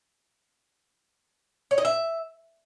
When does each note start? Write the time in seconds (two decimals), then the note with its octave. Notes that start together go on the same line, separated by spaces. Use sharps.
1.71 C#5
1.78 D#5
1.85 E5